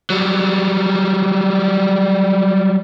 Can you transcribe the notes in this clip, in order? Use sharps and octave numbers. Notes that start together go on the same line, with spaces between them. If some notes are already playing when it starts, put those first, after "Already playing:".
F#3 G3